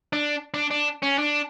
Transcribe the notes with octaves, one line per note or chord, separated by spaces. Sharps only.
D4
D4
D4
C#4
D4